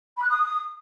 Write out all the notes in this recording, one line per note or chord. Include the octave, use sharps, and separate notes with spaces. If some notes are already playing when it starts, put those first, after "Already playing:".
B5
F#6
D#6